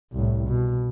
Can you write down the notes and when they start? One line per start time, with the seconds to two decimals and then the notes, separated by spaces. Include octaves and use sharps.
0.12 C2 A2
0.48 B2